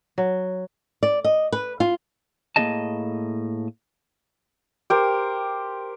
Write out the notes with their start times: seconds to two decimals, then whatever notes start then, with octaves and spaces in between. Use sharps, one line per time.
0.18 F#3
1.03 D5
1.24 D#5
1.52 B4
1.80 F4
2.56 A2 A#3 C#4 G#4 D#5 A5
4.90 G4 A#4 C5